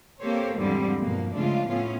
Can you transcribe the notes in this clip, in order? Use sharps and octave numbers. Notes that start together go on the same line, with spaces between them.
A#3 C4 G4 A4 C5 C#5
E2 G#2 D3 F3 G3 C4
G2 B2 F3 A#3
C#3 F3 G#3 A3 D4 F4
A2 A3 B3 C#4 F4